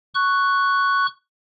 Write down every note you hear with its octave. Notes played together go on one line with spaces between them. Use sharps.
C#6 F#6